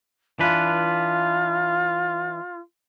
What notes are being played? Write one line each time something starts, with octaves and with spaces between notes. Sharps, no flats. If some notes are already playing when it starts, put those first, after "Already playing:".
E3 D4 F4 B4